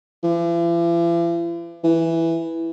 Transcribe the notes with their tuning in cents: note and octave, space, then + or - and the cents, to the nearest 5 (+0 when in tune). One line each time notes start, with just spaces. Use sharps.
E3 +45
E3 +0